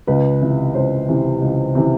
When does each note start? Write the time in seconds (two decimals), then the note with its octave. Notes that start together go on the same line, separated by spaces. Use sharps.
0.07 C#2 B4
0.41 C3 E3
0.75 C#2 C5
1.09 C3 E3
1.41 C#2
1.75 C3 E3